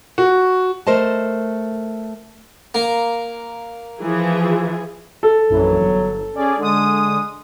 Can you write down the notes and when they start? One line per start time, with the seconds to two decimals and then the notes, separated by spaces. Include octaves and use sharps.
0.18 F#4
0.87 A3 A#4 C5 D#5 A5
2.75 A#3
4.00 E3 F3 G#4
5.23 A4
5.50 A#1 F#2 E3 F#3
5.80 G1
6.36 C#4 G#4 D5
6.58 D3 G#3 D#6